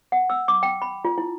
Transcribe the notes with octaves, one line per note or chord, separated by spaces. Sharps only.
F#5
E6
D6
G5
B5
F4
E4